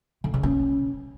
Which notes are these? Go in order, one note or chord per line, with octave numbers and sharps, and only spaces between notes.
D3
C#3
C#4